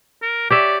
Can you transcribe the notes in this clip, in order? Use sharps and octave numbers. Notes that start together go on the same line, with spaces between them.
A#4
G4 C#5 D5 E5